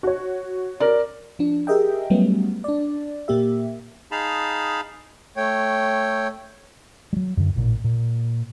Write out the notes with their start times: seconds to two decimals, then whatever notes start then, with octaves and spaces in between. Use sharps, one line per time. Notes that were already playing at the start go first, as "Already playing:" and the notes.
0.03 F#4 C#5
0.80 A#4 D5
1.39 F3 D4
1.67 G4 G#4 A#4 D#5 E5 G5
2.10 F#3 G3 A3 B3 C#4
2.64 D4 D5
3.28 A#2 A#3 G4 E5
4.11 D#4 G#4 F5 A5 B5
5.37 A3 C#5 G5
7.13 F#3 G3
7.37 F#2 D3
7.56 A1 A#2
7.84 A#2